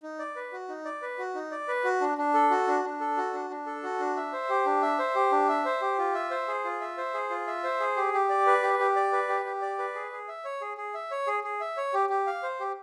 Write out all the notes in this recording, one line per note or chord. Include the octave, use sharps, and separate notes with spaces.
D#4
D5
B4
F#4
D#4
D5
B4
F#4
D#4
D5
B4
F#4
D4
D4
A4
F#4
D4
D4
A4
F#4
D4
D4
A4
F#4
D4
E5
C5
G4
D4
E5
C5
G4
D4
E5
C5
G4
F4
E5
C5
G#4
F4
E5
C5
G#4
F4
E5
C5
G#4
G4
G4
D5
B4
G4
G4
D5
B4
G4
G4
D5
B4
G#4
G#4
E5
C#5
G#4
G#4
E5
C#5
G#4
G#4
E5
C#5
G4
G4
F5
C5
G4